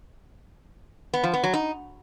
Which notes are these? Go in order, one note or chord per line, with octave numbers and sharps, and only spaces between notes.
B3
F3
B3
F#3
D#4